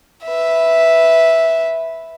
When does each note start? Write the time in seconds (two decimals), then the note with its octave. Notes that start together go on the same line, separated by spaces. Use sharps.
0.25 B4 E5